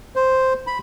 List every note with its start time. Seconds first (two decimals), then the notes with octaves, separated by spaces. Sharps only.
0.16 C5
0.67 B5